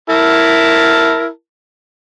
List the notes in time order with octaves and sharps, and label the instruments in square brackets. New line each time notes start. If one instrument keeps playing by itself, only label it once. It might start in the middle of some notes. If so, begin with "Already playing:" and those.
[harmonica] E4 A#4 A5